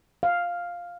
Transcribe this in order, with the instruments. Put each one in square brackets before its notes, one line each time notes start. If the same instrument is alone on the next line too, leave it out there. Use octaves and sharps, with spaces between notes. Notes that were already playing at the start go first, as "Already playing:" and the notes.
[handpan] F5